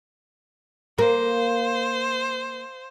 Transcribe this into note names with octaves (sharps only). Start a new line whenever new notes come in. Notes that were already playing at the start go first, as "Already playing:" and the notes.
A#3 C5